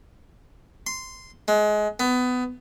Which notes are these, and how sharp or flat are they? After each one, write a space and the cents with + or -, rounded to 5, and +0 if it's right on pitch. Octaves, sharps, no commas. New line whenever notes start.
C6 -10
G#3 +25
B3 +20